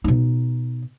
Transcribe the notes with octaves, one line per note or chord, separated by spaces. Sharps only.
B2 D#4